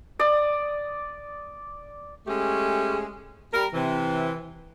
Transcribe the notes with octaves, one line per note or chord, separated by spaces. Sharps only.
D5 D#6
G#3 A3 C#4 G4 G#4
G3 A#4
C3 E3